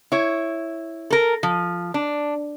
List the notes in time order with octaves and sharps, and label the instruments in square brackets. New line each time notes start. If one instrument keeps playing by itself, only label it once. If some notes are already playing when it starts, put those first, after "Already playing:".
[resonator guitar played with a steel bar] E4 C#5
A4 A#4
F3
D4